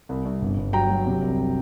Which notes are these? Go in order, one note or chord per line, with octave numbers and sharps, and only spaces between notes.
C2
C2
G1
G1
F#3 G5 A#5
F#3
C3
C2